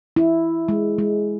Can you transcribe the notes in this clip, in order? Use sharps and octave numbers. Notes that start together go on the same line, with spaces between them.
E4
G#3
G#3